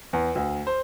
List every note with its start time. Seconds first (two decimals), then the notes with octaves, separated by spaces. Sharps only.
0.13 E2
0.35 D2
0.67 C5